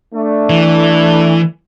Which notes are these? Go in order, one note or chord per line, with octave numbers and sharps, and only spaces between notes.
A3 D4
E3